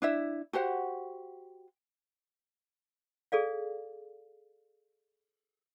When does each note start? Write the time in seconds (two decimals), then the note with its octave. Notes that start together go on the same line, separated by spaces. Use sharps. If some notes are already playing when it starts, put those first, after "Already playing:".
0.02 D4 E4 E5
0.53 F#4 G4 C5 F#5
3.32 G#4 A4 D5 F5